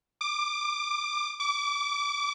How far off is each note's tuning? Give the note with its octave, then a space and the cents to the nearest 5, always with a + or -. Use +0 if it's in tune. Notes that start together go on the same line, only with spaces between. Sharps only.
D6 +20
D6 -25